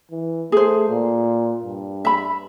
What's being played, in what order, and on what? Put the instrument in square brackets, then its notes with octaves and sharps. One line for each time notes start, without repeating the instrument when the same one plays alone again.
[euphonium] E3
[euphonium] A3 [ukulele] G#4 C5
[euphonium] A#2
G2
[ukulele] E5 B5